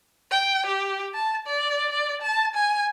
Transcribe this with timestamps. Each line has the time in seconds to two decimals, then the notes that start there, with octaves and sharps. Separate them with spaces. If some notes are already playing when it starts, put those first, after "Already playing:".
0.31 G5
0.66 G4
1.14 A5
1.47 D5
1.90 D5
2.22 A5
2.55 G#5